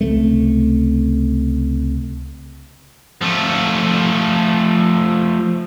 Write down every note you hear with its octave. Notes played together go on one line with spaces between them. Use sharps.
C#2 C3 A3
F3 A3